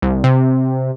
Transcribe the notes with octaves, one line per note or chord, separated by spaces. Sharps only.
C2
C3